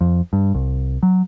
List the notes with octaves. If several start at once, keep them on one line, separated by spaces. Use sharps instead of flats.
F2
G2
C2
F#3